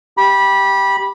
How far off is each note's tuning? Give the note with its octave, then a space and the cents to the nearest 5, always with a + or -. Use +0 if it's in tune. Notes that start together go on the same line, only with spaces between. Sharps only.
G4 +0 B5 -20